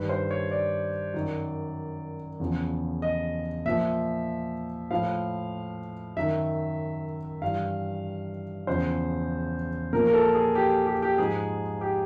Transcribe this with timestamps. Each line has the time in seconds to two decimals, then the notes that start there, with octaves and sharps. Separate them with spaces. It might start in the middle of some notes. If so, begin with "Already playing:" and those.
Already playing: G2 D#3 B4
0.09 C5
0.31 C#5
0.51 D5
1.14 F#2 D#3
2.40 E2 C#3 F3
3.02 D#5
3.65 A#2 F3 E5
4.91 A2 F3 F5
6.16 F#2 D#3 E5
7.42 G2 E3 F5
8.67 E2 C#3 F3 C5
9.93 A#2 F3 A#4
10.07 A#4
10.13 A4
10.35 G#4
10.55 G4
10.87 G4
11.02 G4
11.18 G#2 F3 G#4
11.81 G4